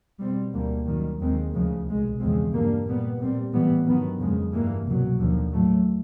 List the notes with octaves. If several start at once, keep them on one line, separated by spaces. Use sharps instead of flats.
B2 G3 C4
D2 D3 G3 A#3
F#2 D#3 G3
D#2 D#3 G#3 C4
D2 C#3 F3 G#3
C2 B2 G#3
E2 C#3 F3 G#3 C4
G2 D3 G3 A#3
A#2 G3 B3
A#2 G3 C4
A2 E3 G3 B3
G2 D#3 F#3 B3
F2 C#3 F3 G#3
G2 E3 G3 A#3
C2 B2 F#3
D#2 D3 F3
A2 F#3 A3